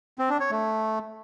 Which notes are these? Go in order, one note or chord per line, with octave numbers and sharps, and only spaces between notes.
C4
D4
C#5
A3